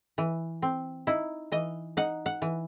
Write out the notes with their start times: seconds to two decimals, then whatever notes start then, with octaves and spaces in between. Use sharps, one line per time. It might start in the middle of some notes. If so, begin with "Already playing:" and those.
0.18 E3
0.62 C4
1.07 D#4 E4
1.52 E3 D#5
1.97 D#4 F#5
2.26 F#5
2.42 E3